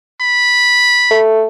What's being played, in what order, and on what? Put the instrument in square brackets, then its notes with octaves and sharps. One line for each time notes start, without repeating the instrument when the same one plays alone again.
[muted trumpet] B5
[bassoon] A3